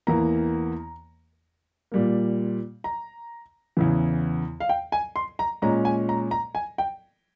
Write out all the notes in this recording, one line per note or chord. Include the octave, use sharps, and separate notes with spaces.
E2 E3 A#3 A#5
A#2 G3 A#3
A#5
E2 C#3 E3
F5
G5
G#5
C6
A#5
A#2 G#3 C#4 A#5
G#5
A#5
A#5
G#5
G5